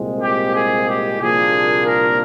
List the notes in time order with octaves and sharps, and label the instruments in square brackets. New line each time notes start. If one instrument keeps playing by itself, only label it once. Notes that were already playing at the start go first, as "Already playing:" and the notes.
Already playing: [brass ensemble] C2 A#2 G#3 C4
G4
G#4
G4
C2 A#2 F3 A#3 D4 G#4
A#4